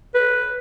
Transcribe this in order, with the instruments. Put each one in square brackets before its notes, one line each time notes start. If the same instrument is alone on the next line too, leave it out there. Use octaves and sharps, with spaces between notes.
[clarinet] B4